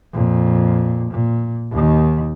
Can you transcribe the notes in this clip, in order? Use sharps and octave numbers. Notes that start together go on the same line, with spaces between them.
F2 A#2
A#2
D#2 D#3